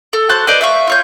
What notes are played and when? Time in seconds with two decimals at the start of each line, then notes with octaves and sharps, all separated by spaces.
0.13 A4
0.29 F#4 C5 A5 F#6
0.47 B4 C5 D5 D#5
0.61 E5 F5 C#6
0.87 F4 C#5 G6